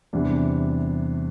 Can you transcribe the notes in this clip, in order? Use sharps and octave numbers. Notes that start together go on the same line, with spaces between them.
E2 C3 G3 D4